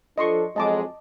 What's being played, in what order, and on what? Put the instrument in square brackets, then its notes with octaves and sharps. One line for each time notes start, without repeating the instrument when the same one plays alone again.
[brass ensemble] F3 D4 A4 [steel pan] D#5 C6 C#6
[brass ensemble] F2 F#3 G#3 [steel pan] D#5 A5 D6